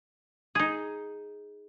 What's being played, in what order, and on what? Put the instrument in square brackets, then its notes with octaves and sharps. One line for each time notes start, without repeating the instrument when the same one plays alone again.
[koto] D#4 G#4